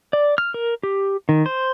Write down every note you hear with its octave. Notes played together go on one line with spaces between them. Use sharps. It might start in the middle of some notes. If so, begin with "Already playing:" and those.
D5
F6
A#4
G4
D#3
C5